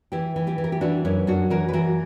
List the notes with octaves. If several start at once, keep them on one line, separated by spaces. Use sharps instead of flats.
E3 E4 G4
E3
E4 G4
E3
A#4
G4
E3 D4 F#4
F#2 C#4 E4
F#2 D4 F#4
E3 F#4 A#4
B4
E3 F#4 A#4